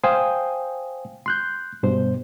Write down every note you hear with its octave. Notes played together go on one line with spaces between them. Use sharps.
C5 F5 G5 G#5 D#6
C6 F#6 G6
G2 B2 C5